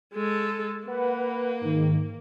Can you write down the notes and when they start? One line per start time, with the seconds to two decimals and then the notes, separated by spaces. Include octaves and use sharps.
0.14 G#3 A4
0.87 A#3 B4 F#5
1.61 G#2 D#3